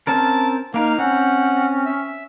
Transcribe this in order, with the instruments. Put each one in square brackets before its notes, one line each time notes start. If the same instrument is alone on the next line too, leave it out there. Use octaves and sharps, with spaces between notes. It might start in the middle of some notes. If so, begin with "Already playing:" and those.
[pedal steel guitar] C4 C#4 A#4 [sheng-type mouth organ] A5
[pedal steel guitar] A#3 A#4 [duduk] D#4 [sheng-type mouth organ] F5 F6
[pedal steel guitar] C4 [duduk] C#4 [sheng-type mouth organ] F#5
[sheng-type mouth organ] E5